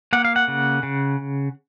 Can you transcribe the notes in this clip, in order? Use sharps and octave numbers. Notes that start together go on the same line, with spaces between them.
A#3 F#5
F5
F#5
C#3
C#3